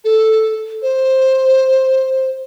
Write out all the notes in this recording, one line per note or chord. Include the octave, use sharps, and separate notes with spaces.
A4
C5